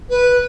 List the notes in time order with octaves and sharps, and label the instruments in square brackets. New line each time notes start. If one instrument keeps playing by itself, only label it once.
[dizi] B4